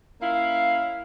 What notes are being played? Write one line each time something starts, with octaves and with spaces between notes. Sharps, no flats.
A#3 C#4 E4 F5